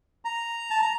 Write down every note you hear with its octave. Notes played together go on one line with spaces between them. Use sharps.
A#5
A5
A#5